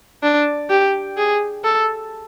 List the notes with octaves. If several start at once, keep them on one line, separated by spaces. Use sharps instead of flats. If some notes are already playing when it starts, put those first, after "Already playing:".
D4
G4
G#4
A4